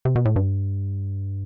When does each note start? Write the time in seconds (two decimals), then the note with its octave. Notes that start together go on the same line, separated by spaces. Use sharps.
0.05 C3
0.16 B2
0.25 A2
0.36 G2